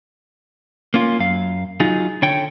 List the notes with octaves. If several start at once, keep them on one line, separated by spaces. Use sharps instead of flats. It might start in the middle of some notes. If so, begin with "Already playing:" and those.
A#3 C#4 F4
F#2 F5
F#3 D#4 F4 G#4
D3 C#5 G5